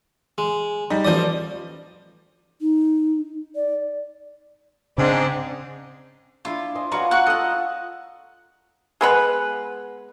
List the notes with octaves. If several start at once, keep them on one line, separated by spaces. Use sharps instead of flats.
G#3
G3 D#4
A1 F3 D5 D#5 D#6
D#4
D5
G#2 C#3 C4 D4
D4 E4 F4
C5 D#5 G#5
C#4 F4 F#4 B4 D5 A#5
F#4 F#5 F#6
D#4 A4 D#5 F#5
G#3 B3 B4